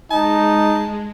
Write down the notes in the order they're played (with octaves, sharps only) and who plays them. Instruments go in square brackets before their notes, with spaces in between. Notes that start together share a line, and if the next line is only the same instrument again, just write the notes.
[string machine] G#3 [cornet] D#4 [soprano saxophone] A5